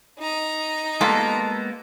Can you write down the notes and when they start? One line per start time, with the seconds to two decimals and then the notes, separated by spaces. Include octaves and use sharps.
0.19 D#4 A#5
1.01 G3 G#3 A#3 B3 F4 A4